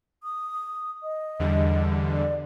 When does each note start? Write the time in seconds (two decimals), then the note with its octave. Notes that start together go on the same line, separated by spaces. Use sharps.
0.23 D#6
1.03 D#5
1.39 E2 D3 G3
2.12 D5